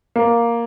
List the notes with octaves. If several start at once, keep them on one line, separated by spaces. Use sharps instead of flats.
A#3